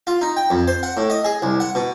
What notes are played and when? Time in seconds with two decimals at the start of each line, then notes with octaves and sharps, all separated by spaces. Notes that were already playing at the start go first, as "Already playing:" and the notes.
0.07 F4
0.21 D#4
0.37 G5
0.50 F2
0.68 C5
0.83 F#5
0.97 A2
1.10 D#5
1.25 G#4
1.42 C2
1.60 F#5
1.75 B2